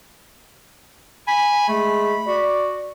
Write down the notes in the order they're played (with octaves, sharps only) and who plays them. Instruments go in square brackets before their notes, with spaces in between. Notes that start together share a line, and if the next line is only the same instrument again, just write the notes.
[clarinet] G#5 [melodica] B5
[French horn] G#3 [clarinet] A3
[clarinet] F#4 [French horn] D5